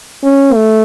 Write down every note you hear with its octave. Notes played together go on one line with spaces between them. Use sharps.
C#4
A3